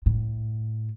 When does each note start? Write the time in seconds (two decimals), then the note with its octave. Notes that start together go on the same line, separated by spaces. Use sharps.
0.06 A2